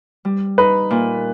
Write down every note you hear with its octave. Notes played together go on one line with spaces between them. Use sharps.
G3
D#4 B4
A#2